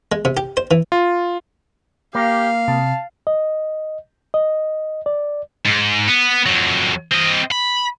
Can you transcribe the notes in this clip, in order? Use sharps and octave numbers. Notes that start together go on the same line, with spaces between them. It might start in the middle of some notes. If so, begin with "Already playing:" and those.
G#3
C3
G4
C5
E3
F4
A#3 G4 F5
C3 A5
D#5
D#5
D5
G#2
B3
F2 F#3
C4 D#5
B5